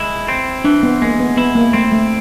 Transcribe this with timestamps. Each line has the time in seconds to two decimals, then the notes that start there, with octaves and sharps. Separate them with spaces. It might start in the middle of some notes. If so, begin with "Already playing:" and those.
Already playing: G#3 E4
0.28 C4
0.65 E3 D4
0.83 B3
1.02 G#3 A#3
1.20 B3
1.37 B3 E4
1.55 A#3
1.73 A3 C4
1.92 A3